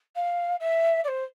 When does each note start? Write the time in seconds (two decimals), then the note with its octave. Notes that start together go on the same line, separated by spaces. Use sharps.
0.16 F5
0.60 E5
1.04 D5
1.08 C5